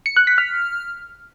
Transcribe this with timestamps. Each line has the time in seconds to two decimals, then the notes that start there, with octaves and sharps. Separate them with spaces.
0.06 C#7
0.17 F#6
0.27 B6
0.38 F6